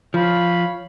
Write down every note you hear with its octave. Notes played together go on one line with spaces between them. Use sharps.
F3 C#5 F5 B5